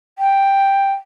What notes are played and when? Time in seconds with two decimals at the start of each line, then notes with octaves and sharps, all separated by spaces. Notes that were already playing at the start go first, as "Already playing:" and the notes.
0.19 G5